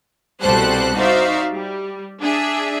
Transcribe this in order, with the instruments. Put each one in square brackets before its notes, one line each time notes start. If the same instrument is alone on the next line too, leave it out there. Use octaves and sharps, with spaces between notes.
[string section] C2 B2 G3 A4 C5 F#6
D#4 F#4 C5 D5 E5 F5
G3
D4 G#4 E5